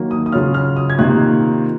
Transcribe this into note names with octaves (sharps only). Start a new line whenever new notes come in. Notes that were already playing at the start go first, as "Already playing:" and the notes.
Already playing: D#3 F#3 A#3
D#6
D#6
C#3 F#3 C#4 F4 F6
F6
D#6
G#6
C3 D#3 A#3 F4 F#6